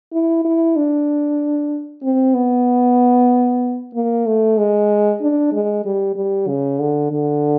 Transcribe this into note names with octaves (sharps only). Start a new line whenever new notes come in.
E4
E4
D4
C4
B3
A#3
A3
G#3
D4
G#3
G3
G3
C#3
D3
D3